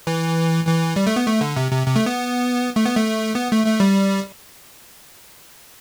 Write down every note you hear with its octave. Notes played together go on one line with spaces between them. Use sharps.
E3
E3
G3
A3
B3
A3
D3
C3
C3
C3
A3
B3
A3
B3
A3
B3
A3
A3
G3